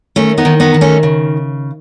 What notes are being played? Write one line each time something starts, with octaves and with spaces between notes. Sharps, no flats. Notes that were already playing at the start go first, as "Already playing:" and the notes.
D#3 A3 C#4
B3 D#4
D#3
B3 D#4
D#3
A3 C#4
C#3